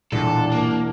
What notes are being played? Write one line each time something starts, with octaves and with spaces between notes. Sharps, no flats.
E1 A#2 D4 A4
A#3